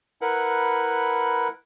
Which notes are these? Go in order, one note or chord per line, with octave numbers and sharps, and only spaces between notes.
E4 A#4 B4 F#5